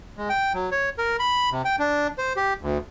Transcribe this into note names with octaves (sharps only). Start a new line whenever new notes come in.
G#3
G5
F#3
C#5
A#4
B5
C3
G5
D4
C5
G4
D2